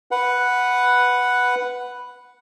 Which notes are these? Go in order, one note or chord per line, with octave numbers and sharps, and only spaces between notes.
B4 F#5